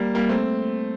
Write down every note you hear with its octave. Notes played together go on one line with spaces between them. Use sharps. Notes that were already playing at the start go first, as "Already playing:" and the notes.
Already playing: G3 A#3
G3 A#3
A3 C4